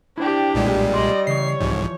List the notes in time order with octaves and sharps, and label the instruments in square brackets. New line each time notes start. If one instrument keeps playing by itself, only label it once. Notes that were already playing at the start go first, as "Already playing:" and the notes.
[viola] D4 G4 [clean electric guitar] E4 C5 G5
[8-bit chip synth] B1 A#2 G#3 [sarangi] G3
[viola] D5 D#5 [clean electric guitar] C6
[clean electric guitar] C#3 E3 [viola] C#5 [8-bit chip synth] C7
[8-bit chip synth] C2 G#2 [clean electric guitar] E3 F3